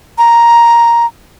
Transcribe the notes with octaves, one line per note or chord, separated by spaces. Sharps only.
A#5